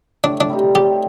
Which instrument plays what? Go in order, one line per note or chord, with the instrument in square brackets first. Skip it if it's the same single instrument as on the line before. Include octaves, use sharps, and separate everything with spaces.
[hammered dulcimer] A2 [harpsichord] D4
[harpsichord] D4
[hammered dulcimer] G3 C4 D#4
[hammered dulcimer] A2 [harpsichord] G4